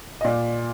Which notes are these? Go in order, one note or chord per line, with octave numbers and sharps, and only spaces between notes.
D#5
A#2 D5